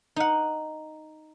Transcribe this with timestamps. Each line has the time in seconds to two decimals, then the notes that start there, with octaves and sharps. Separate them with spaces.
0.16 D#4 F#5